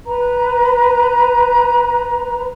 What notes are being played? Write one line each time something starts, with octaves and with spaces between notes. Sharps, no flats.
B4 A#5